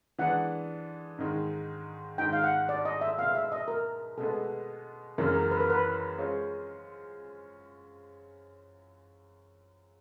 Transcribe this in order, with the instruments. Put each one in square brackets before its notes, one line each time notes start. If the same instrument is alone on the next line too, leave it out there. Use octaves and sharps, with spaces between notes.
[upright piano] E3 G#3 B3 D4 [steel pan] F#5
[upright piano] G#2 D#3 G#3
[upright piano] G#2 D#3 G#3 [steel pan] G5
[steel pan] F5
F#5
D5
D#5
E5
[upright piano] B2 G#3 B3 [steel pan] F5
[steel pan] E5
D#5
A#4
[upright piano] B2 G#3 B3 [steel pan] A4
[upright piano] F#2 C#3 E3 G#3 [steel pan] A#4
[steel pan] A#4
B4
A#4
B4
[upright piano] G#3 C#4 F4 G#4 C5